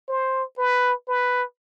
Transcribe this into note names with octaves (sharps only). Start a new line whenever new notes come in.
C5
B4
B4